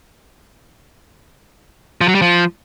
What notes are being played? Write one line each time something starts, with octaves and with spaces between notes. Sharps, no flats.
F3
F#3
G3
F3